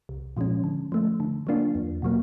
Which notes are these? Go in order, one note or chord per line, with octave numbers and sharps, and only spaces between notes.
C2
A#2 F3 G#3 C#4
D3
F3 A3
D3
F#3 A#3 D4 F4
E2
B2 F#3 A#3